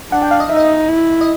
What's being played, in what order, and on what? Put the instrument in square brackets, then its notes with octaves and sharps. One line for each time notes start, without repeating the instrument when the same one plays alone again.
[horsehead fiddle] D4 [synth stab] F#5
[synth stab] G5
F5
D#5
[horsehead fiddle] D#4 [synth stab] E5
[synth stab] D#5
[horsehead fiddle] E4
[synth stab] D#5